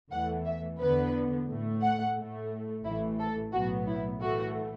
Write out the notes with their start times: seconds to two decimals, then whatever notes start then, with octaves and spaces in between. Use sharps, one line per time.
0.11 E2 E3 A3 F#5
0.45 E5
0.80 E2 D3 B3 B4
1.48 A2 A3
1.82 F#5
2.16 A2 A3
2.84 A1 A2 E3 A3 E4
3.19 A4
3.52 B1 A2 F#3 B3 F#4
3.87 E4
4.21 A2 E3 A3 F#4